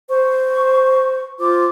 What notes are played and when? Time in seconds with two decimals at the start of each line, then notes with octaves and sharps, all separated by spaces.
0.09 C5 C#6
1.39 F4 C5 D6